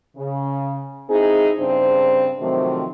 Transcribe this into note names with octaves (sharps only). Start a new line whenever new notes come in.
C#3
C4 D#4 E4 G#4
G2 C#3 C4 D4 C5
C3 D#3 F3 F#3 A3 C4